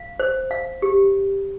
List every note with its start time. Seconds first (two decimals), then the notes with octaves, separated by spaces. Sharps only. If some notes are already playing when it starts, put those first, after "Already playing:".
Already playing: F5
0.20 C5
0.51 F5
0.82 G4